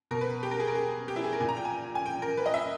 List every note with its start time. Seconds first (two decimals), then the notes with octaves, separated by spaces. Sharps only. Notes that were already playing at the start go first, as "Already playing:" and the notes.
0.11 B2 A#4
0.21 B4
0.43 G4
0.51 A#4
0.60 G#4
0.67 A#4
0.75 G#4
1.08 G4
1.16 E4
1.24 G#4
1.33 A#4
1.40 A#2 G#5
1.49 A#5
1.57 G5
1.65 G#5
1.95 G#5
2.06 G5
2.22 A#4
2.37 B4
2.46 D#5
2.54 E5